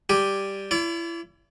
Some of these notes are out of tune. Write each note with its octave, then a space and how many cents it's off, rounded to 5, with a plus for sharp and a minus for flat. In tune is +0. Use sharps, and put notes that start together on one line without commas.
G3 +0 G4 +0 G#5 +0
E4 +30 D5 -35